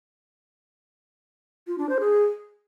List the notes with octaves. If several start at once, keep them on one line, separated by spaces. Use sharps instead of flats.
F4
D4
C5
G#4